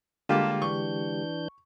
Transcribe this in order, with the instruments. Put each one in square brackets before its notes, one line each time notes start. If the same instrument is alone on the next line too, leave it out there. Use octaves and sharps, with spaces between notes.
[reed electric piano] D3 G#3 G4 [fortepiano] G3 A#3 F4 [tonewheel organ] A5
[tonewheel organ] E3 D4 G6 [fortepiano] C#6